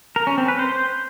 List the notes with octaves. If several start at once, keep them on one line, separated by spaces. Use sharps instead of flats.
A#4
C#4
C4
B4
C5